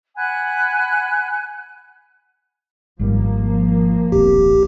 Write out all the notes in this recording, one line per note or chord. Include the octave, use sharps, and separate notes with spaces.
F#5 G#5 B5 F#6
G#1 G#2 F3 G3 A#3
D#1 B1 C4 G4